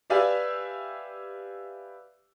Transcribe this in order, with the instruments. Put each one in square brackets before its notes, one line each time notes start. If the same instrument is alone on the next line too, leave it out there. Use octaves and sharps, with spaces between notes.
[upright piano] G4 B4 D5 E5 F5 G#5